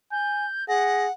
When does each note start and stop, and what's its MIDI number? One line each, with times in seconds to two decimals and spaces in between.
0.12 0.46 80
0.12 0.67 91
0.68 1.07 68
0.68 1.12 78
0.68 1.05 94